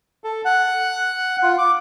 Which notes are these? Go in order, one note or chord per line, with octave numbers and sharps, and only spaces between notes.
A4
F#5
F4
D6